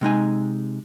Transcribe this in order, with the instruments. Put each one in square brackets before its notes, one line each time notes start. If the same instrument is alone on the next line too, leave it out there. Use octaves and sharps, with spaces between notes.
[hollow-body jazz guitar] C3 G#3 D#4 G#5